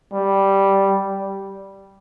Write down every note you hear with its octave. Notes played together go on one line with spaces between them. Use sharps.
G3